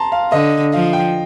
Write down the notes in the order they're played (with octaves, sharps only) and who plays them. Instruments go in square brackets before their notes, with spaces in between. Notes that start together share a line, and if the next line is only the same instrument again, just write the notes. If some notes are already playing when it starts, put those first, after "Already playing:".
Already playing: [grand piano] A5 A#5 C6
F5
[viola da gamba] D3 [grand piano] D#5
[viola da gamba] F3 [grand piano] F5
[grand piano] G5